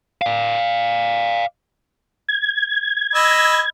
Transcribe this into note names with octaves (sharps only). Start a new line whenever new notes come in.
D5 F5
G#6
D#5 B5 E6